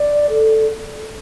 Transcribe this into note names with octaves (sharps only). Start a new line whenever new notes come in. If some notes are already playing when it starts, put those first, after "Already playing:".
Already playing: D5
A4